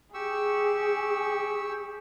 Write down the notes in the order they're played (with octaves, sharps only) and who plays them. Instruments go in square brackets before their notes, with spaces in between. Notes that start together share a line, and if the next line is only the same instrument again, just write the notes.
[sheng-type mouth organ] G4 C#6 E6 [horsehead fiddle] G#4